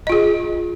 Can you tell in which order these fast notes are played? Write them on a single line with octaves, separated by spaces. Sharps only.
D#5 F4 G#4